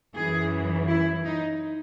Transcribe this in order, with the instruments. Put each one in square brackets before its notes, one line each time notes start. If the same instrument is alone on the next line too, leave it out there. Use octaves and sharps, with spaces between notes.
[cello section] F#2 E3 G#4
E4
D#4